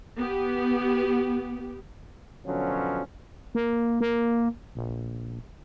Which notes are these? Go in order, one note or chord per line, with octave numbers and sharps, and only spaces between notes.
B3 G4
B2 D3 F3 F#3 C#4
A#3
A#3
A#1